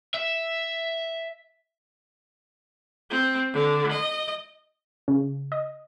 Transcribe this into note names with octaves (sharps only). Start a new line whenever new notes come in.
E5
C4
D3
D#5
C#3
D#5